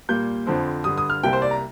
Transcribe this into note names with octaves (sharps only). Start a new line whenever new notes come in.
A#2 G3 A#3 G6
F2 D3 F3 C4
G2 D3 G3 D#6
D#6
F6
C2 C3 G3 A#3 G5
C5
D5
A#5